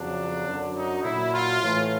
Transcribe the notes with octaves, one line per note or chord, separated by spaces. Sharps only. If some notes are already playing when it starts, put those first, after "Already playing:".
Already playing: F2 C#3 F#3 D4
F#2 D3 F#3
D#4
A#2 F#3 E4
F4
A2 E3